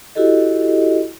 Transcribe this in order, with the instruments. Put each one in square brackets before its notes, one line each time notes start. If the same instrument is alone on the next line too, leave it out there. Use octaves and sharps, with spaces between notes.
[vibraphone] E4 F#4 G4 A4 D#5